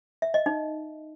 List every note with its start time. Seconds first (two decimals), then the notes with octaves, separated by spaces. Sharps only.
0.22 E5
0.34 D#5
0.46 D#4